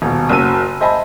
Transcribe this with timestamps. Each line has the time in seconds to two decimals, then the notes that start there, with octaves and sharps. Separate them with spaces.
0.02 D#1 B2
0.29 F#1 F#3 E6 D#7
0.81 C5 D#5 E5 G#5 A5 B5